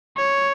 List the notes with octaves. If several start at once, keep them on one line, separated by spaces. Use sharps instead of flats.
C#5